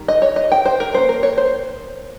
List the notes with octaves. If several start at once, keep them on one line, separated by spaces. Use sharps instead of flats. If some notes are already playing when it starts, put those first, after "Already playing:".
Already playing: D#3 G3
D#5
C#5
D#5
G5
C5
A#4
F3 A#3 C#4 C5
A#4
C#5
C5